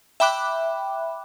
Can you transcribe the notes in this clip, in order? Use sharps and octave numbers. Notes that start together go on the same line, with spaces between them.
E5 G5 B5 D6 F#6